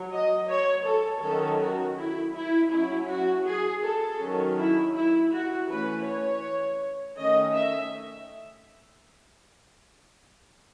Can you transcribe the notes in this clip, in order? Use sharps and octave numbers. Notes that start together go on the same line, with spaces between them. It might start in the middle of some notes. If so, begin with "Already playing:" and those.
Already playing: F#3
D#5
C#5
A4
D#3 F#3 C#4 A4
F#4
E4
E4
F#3 C#4 E4
F#4
G#4
A4
D#3 F#3 C#4
E4
E4
F#4
E3 A3 C#4 B4
C#5
D#3 A3 C#4 D#5
E5